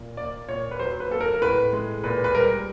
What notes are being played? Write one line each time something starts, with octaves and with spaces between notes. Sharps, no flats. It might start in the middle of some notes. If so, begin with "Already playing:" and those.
Already playing: A#2
A#3 D5
A#2 C#5
B4
F#3 C5
B4
A#3 A4
A#4
A#4
A2 B4
G#3
A#2 B4
B4
G3 A#4